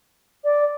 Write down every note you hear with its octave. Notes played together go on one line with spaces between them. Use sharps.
D5